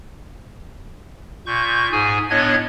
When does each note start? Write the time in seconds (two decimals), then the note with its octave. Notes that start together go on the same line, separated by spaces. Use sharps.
1.46 A#2 C#6 G6
1.92 G#2 G#4 G#5
2.30 A2 B3 D4 C#5 D#5 G#6